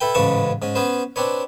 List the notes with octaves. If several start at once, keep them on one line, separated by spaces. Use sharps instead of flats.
E4 A4 B4 G5
A1 G#2 C#3 B4 A5 C#6
G#2 C#4
B3 C#4 B4 C5
C4 D4 B4 C#5